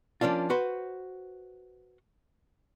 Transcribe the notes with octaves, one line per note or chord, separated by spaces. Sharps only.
F3 A#3 C#4 D4 F4
F#4 B4 C5